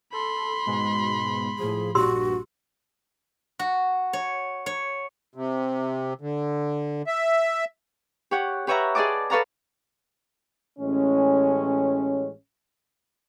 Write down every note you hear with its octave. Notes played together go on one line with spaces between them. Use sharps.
A4 B5 C6
G#2 B2 G#3
A2 F3 G#4
A#1 G2 A#2 F#4 G4 C6 E6
F#4
C#5
C#5
C3
D3
E5
G4 C#5 F#5
G4 B4 C#5 E5 F#5 A#5
G#4 D5 D#5 A5 D6
A4 B4 C#5 F5 A5 A#5
A1 A2 G#3 C#4